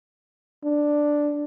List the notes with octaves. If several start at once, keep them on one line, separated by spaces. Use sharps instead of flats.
D4